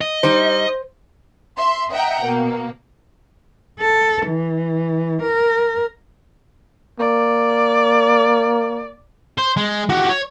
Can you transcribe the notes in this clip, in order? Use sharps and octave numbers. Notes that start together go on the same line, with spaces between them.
D#5
G3 D#4 C5
E5 C6
D#5 E5 F#5 G5 A#5
B2 A#3
A4
E3
A#4
A#3 D5
C5
G#3
F#4 G4
C#5